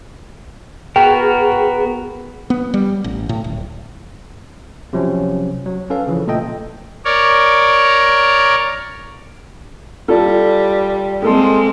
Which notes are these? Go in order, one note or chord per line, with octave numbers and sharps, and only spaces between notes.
B3 F#4 G#4 A#4 G5
B3
G3
A1
A2
D1
C3 F3 F#3 C4 C#4
F#3
C#4 A4 B4 F5
C#3 E3 F3
A#2 A3 A4 D#5 G5
A#4 C#5 D5
G3 F4 A4
G#3 A#3 C4 G#4 A4 C6